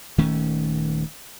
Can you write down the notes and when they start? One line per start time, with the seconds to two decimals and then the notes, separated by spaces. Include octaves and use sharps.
0.18 D#1 D#3 A3 C#4